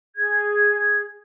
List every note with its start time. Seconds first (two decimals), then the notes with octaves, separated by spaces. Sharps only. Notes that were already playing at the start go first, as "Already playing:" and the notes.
0.16 G#4 G#6